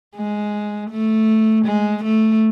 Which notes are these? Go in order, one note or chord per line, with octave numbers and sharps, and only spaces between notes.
G#3
A3
G#3
A3